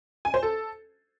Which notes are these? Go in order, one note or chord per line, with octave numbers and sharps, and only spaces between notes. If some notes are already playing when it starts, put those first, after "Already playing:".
G#5
C5
A4